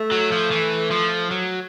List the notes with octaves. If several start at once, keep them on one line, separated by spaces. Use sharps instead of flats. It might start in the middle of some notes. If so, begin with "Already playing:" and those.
Already playing: A3
F#3
F3
E3
F3
F#3